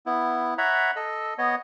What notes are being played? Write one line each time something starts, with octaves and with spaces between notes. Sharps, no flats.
B3 E4
C#5 E5 F#5 A#5 B5
A4 D#5 E6
B3 C#5 D#5